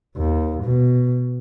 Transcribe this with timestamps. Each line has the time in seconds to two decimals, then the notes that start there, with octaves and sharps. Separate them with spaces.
0.17 D#2
0.64 B2